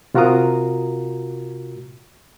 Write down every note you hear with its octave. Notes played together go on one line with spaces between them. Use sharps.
C3 F4 F#4 A#4 A#5 D#6